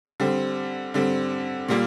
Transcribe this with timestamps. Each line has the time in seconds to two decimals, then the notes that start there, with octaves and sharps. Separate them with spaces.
0.20 D3 G3 C4
0.94 D3 G3 C4
1.68 A#2 G3 A#3 F4